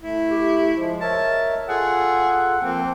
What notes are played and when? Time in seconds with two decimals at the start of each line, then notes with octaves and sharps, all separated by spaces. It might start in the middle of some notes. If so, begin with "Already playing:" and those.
0.02 A3 E4
0.30 G4
0.77 F3 G#3 C5
1.01 A#4 C#5 D#5 E5 A5
1.68 F4 G#4 A4 F#5
2.61 F3 A#3 C4 G5